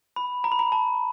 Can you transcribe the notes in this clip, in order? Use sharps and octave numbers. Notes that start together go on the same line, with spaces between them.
B5
A#5
B5
A#5
A5